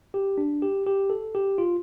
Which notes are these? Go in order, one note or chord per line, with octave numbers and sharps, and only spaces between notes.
G4
D4
G4
G4
A4
G4
F4